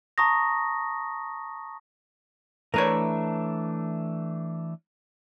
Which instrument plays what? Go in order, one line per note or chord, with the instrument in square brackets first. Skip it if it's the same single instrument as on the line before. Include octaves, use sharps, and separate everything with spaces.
[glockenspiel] A5 A#5 C#6 D#6 A#6
[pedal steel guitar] E3 A3 D4 [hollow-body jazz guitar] A#4 B4 C#5